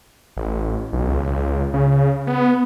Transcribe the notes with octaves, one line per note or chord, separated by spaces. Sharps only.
A1
B1
C#2
C#3
B3